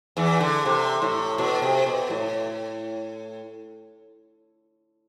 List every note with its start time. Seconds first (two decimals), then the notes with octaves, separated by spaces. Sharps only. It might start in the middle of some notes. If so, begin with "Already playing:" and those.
0.17 E2 E3
0.40 D3
0.65 C3
1.02 A2
1.38 B2
1.62 C3
1.86 B2
2.10 A2